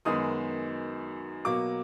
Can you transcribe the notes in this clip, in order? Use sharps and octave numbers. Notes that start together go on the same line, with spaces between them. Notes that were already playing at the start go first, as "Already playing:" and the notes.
F#2 D#3 G#3 B3 D#6
B2 F#3 A#3 D6